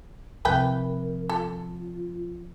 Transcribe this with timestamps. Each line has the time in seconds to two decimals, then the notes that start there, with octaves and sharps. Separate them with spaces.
0.45 C3 E3 F3 A#4 B4 G5
1.29 F4 A4